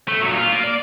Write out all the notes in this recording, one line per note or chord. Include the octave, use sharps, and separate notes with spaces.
A3
A#2 F#3
F4
A#3
D5